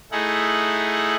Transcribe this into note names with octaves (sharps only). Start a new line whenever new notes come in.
A3 D#4 E4 G#4 F#5